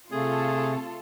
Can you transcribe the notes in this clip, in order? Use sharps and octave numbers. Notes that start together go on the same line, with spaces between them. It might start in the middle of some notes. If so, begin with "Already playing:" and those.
C3 A3 F4 G#4 A4